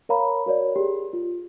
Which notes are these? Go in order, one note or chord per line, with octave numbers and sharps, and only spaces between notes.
A#4 C#5 F5 A#5 B5
F#4 A#4 C#5 D5
G4 G#4
F4